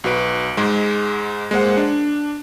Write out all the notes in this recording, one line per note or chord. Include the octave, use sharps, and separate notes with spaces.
B1 F#4 B4 D7
G#2 G#3
G#3 A#3 C5 F#5
D4